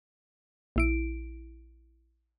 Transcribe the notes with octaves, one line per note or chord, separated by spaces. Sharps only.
A#1 E4 D7